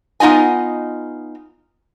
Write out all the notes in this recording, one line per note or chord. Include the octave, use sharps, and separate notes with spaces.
B3 D#4 F4 D#5 G#5